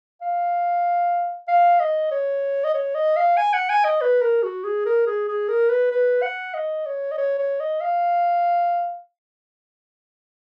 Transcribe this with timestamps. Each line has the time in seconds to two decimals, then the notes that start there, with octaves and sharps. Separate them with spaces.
0.21 F5
1.48 F5
1.79 D#5
2.11 C#5
2.64 D#5
2.74 C#5
2.95 D#5
3.16 F5
3.37 G#5
3.54 F#5
3.70 G#5
3.85 D#5
4.01 B4
4.22 A#4
4.43 F#4
4.64 G#4
4.86 A#4
5.06 G#4
5.28 G#4
5.48 A#4
5.69 B4
5.91 B4
6.22 F#5
6.54 D#5
6.86 C#5
7.11 D#5
7.18 C#5
7.38 C#5
7.60 D#5
7.81 F5